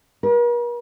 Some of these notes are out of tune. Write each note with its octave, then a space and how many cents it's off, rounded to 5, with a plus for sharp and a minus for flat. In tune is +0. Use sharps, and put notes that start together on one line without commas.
A#4 +45